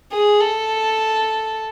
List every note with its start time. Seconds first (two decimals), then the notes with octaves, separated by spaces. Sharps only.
0.12 G#4
0.40 A4